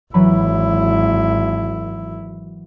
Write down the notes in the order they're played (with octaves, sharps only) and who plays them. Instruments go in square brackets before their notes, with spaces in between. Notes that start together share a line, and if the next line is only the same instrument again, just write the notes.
[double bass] G#1 E4 [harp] E3 F#3 B5